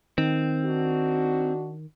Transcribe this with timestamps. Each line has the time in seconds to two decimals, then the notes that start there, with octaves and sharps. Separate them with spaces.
0.18 D#3 C4
0.64 D4 D#4 F#4